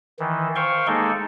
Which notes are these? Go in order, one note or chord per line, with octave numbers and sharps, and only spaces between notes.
D#3 E3
C5 F5 G5 C6 C#6
G#3 A#3 D#4 G#4 A4